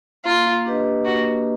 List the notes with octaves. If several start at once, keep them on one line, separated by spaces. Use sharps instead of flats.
A#3 F4
D4 G4 B4 D#5
A#3 F#4